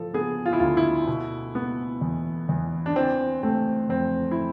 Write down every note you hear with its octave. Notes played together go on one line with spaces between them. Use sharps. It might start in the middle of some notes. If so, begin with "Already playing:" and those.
Already playing: F3 A4
B3 G#4
F4
E4
D2 F4
E4
B2
B3
E2
E2
D4
E3 C4
A3 C4
F2 C4
E4